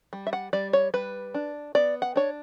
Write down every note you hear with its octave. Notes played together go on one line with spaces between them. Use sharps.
G3
E5
F#5
G3 D5
C#5
G3 B4
D4
B3 D5
F#5
D4 C#5